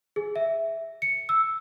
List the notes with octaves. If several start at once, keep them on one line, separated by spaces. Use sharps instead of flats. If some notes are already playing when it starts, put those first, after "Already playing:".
G#4
E5
C#7
E6